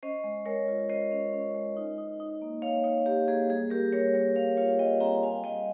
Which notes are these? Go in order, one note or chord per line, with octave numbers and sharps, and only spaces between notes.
C#4 C5 D#5
G#3
G#3 A#4 C#5
F4
C#4 C5 D#5
C#4
C#4
G#3
D#4
D#4
D#4
A#3
A#3 C#5 F5
D#4 C#5 F5
A#3 G4
A#3 G#4
G3 G#4
G3 G4 A#4
G3 A#4 C#5
G3 A#4 C#5
G3 C#5 F5
F4 C#5 F5
G3 D#5 G5
C4 G5 A#5
G3 F5 G#5
G3 D#5 G5